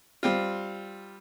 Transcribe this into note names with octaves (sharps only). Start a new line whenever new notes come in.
G3 C4 F4